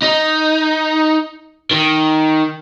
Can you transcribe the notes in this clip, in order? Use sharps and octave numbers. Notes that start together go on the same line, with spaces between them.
D#4
D#3